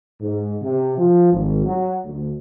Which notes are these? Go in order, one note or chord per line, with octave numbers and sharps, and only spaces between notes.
G#2
C3
F3
G#1
F#3
D2